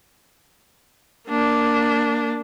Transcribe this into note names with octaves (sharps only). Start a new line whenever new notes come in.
A#3 D4